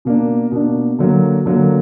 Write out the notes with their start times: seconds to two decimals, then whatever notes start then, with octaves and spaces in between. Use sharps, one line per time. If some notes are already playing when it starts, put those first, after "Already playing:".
0.05 B2 A#3 D4
0.52 B2 A#3 D4
0.99 D3 F#3 A#3
1.46 D3 F#3 A#3